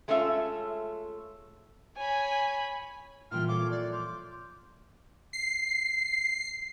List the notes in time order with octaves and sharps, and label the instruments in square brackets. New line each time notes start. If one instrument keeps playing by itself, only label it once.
[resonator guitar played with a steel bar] G#3 A3 C#4 F4 E5
[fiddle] C#5 B5 [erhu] G#5
[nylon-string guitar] A#2 F3 G5 [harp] E3 G3 F4 [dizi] F6
[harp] A4 C#5 F5 [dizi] D6
[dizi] D5 [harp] F#6
[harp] C6 F6 G6 [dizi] D6
[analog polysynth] C7